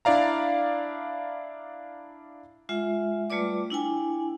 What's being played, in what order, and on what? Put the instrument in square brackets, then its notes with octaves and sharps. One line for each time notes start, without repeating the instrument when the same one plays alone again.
[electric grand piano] D4 E4 D5 F5 A#5
[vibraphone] G#3 F4 E5 F#5
G3 A3 F4 B4 D5 D6
D4 E4 G5 G#5